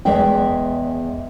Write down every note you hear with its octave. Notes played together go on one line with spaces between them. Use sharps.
E2 G#3 D5 E5 G5